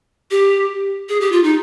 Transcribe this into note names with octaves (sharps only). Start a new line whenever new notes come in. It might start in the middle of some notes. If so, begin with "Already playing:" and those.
G4
G#4
G4
F4
D#4